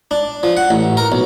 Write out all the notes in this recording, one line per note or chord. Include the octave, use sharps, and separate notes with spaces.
D4
F3
F#5
A1
A#4
B1